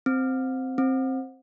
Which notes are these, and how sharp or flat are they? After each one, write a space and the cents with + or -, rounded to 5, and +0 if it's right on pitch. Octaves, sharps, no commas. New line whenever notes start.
C4 -5
C4 +10